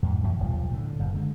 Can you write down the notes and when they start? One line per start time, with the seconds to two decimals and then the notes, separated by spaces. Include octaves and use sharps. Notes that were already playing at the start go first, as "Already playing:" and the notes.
0.03 E2 G#2
0.23 F#2 A2 F3 F#3
0.40 D#1 B1 F3 G3
0.71 A2 D3
0.99 F#1 F#2
1.14 D3 G#3